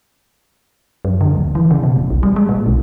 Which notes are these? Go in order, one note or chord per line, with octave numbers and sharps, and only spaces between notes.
F#2
D3
D1
E3
C#3
B2
E1
B1
G3
G#3
A#2
B1